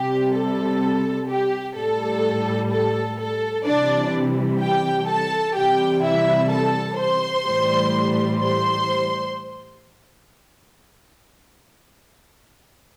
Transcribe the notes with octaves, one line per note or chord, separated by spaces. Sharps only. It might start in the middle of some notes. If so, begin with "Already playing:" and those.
Already playing: C3 G3 G4
A4
G4
A2 G3 A4
A4
A4
C3 E3 G3 D4 D5
G4 G5
A4 A5
C3 E3 G3 G4 G5
E4 E5
A4 A5
C5 C6
A2 E3 G3
C5 C6